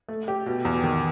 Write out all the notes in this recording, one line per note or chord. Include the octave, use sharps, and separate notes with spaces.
A3
G4
B2
E2
D#3